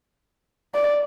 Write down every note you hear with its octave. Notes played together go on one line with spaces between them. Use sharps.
D5